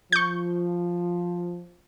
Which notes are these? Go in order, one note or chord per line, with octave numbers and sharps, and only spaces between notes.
F3 C#6 G6